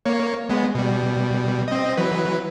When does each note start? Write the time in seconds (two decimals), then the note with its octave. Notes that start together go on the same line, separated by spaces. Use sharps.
0.05 A#3 C#5
0.49 G#3 B3
0.75 B2 G3
1.68 C4 D#5
1.97 E3 F#3 B4